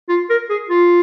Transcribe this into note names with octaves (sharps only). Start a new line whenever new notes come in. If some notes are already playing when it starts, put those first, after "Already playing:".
F4
A#4
G#4
F4